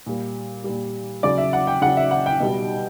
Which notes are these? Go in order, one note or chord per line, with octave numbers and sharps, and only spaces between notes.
A#2 G3
A#2 G3
C#3 F#3 D5
E5
F#5
G5
C#3 F#3 F#5
E5
F#5
G5
B2 G3